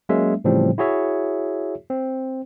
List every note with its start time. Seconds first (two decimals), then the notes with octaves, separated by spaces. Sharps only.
0.09 F#3 G#3 A#3 C#4 E5
0.44 A2 C#3 E3 F3 G3 C4
0.78 E4 F#4 G#4 C#5 E5
1.90 C4